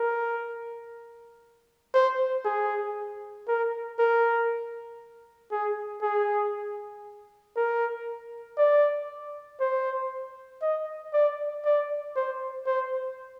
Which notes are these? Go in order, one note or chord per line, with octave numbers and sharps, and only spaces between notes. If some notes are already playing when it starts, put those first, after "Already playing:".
Already playing: A#4
C5
G#4
A#4
A#4
G#4
G#4
A#4
D5
C5
D#5
D5
D5
C5
C5